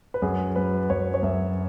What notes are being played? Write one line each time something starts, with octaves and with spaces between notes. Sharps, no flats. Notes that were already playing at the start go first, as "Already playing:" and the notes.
B4
F#2 G#4
F#3 B4
F#2 C#5
C#5
F#2 E5